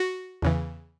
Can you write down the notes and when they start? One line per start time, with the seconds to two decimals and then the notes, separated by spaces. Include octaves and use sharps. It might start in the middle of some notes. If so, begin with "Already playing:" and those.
Already playing: F#4
0.42 E2 C#3 E3